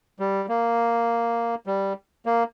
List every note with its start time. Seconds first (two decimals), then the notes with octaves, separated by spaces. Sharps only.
0.20 G3
0.49 A#3
1.67 G3
2.26 A#3